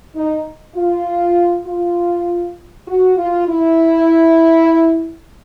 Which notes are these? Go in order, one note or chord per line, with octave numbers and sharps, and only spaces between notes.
D#4
F4
F4
F#4
F4
E4